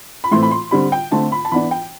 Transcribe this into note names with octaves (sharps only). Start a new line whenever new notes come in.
B5
A2 E3 A3 C4 C6
B5
C6
D3 G3 C4 B5
G5
D3 A3 C4 A5
B5
A5
E3 B3 D4 B5
G5